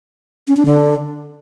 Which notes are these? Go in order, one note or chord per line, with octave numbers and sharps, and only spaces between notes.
C#4
D4
D3